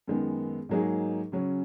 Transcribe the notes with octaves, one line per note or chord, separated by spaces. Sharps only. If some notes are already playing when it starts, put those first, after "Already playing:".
F#2 D#3 G#3 B3
G#2 F#3 A#3 D#4 G#4
C#3 F#3 C#4